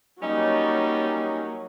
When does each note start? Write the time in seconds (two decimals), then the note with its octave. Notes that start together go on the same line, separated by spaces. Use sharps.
0.22 F#3 G3 A#3 C#4 D#4